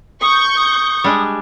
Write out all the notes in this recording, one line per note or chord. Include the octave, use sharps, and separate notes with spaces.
C#6 D#6 G6
D#6
G3 G#3 D4